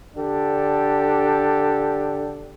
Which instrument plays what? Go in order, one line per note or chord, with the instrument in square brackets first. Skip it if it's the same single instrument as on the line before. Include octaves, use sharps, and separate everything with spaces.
[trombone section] D3 D4 G4 A4